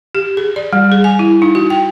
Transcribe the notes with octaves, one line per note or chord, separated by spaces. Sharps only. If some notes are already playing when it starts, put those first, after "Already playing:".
G4
G#4
D5
G3
G#4
G#5
E4
D#4
F#4
G5